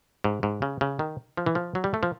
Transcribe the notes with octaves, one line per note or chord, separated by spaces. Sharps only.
G#2
G#2
C#3
C#3
D#3
F3
E3
F3
F#3
G3
A3
F3